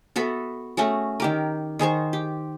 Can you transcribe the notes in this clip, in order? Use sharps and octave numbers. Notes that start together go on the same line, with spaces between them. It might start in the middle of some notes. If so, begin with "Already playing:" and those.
B3 F#4 A4 E5
A3 C#4 F#4 G#4
D#3 G4 A#4
D#3 G#4 C5 C#6
G4